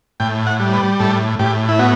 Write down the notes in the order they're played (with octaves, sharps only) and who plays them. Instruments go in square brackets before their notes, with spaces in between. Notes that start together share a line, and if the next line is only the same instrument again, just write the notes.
[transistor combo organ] A2 G5
F#5
G3
B4
A2 A4
A2 G4
E4
B3 F#4